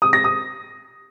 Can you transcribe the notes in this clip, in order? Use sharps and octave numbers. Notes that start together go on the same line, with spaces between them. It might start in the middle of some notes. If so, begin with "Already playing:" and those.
D#6
A#6
D#6